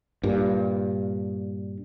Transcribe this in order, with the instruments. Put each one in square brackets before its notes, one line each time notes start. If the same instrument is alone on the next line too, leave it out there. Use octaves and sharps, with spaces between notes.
[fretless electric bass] G2 A#2